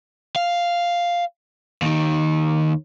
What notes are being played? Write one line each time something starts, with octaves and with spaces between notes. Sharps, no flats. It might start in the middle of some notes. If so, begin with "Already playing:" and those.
F5
D#2 D#3